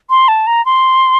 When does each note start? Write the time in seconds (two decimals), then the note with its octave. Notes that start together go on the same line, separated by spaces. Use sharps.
0.10 C6
0.28 A5
0.47 A#5
0.65 C6